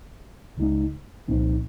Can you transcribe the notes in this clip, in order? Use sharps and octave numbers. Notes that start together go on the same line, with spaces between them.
C#2 C#3 G#3 D#4
C2 A#2 F3 C4 D#4